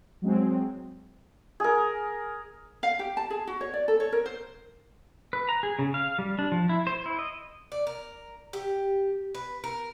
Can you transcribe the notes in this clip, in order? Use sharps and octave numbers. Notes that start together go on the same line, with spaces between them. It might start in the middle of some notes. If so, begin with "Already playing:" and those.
F#3 G#3 C4
G#4 A#4
F5
G4
A5
G#4
F#4
C#5
D5
A4
C#5
A#4
C5
B4
A#5
G#4
C#3
F5
G3
D4
F3
E4
C5
E4
D#5
D5
A#4
G4
B4
A#4